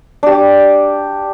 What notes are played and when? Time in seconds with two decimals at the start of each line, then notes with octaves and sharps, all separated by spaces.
0.23 D4 G4